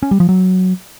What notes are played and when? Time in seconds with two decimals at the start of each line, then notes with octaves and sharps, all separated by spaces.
0.03 C#4
0.11 G3
0.20 F3
0.29 F#3